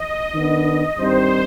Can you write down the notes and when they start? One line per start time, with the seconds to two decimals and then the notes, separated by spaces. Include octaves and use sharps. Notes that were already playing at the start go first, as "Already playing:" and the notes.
Already playing: D#5
0.33 D#3 B3 D4
0.97 G2 D#3 G3 C4 D#4 C5